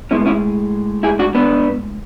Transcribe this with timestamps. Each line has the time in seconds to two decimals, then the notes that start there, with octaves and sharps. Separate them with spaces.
0.11 A2 G#3 B3 C#4 E4
0.26 C#4 E4
1.03 E4 G#4
1.19 D4 F#4
1.35 B3 D4